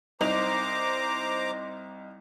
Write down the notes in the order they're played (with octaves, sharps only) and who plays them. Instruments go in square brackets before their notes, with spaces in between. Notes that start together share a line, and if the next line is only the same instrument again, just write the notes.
[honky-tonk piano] C2 D#4 F7 [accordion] C5 A#5 D6